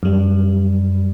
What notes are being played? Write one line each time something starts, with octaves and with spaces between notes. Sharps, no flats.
F#2 G3